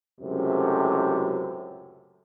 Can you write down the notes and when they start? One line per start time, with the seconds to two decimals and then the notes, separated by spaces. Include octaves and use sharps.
0.21 C#2 F#2 A2 C3